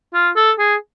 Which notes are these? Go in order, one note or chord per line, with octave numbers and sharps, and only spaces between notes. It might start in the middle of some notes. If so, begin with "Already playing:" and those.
F4
A4
G#4